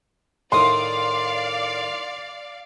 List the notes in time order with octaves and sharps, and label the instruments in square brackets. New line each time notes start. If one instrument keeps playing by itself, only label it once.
[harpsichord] A2 D#3 D#6 [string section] D5 F5 [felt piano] C6